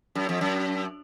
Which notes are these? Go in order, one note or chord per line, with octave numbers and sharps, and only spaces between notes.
F#2
F2
F#2